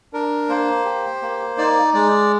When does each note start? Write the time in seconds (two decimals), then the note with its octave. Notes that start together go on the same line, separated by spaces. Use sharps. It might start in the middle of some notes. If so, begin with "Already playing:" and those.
0.13 D4 A#4
0.49 A#3 C5
0.85 G4
1.22 A#3
1.58 D#4 D5
1.94 G#3 D5